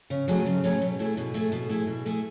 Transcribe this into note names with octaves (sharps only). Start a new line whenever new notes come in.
C#3
F#3 A3 C#4 G#4
C#3
F#3 A3 C#4 G#4
B2
A3 E4 G#4
B2
A3 E4 G#4
B2
A3 E4 G#4
B2
A3 E4 G#4